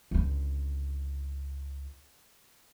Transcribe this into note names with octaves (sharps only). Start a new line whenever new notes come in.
C#2 D3